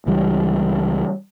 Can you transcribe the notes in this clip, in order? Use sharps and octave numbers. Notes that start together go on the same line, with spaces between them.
C#2 E3 G3